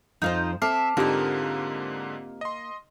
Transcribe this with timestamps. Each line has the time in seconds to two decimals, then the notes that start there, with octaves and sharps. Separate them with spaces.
0.22 F2 F3 D#4 F4 C5
0.62 C4 A4 E5 D6 F6 C7
0.97 G#2 D3 A#3 C4 D#4 F4 G4
2.41 D#5 C6